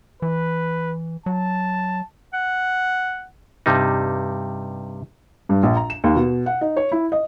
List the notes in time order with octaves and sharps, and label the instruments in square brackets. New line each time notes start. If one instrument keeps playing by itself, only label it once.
[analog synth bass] E3 [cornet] B4
[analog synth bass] F#3 [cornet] A5
[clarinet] F#5
[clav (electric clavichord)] G2 C3 G3 D#4
[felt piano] G2
A#1
A#5
E7
D#2
B2
F#5
D#4
C#5
E4
D#5